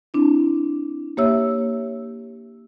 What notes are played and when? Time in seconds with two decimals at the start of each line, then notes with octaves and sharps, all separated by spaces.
0.14 C4 D4 E4
1.17 A#3 G4 C#5 E5 E6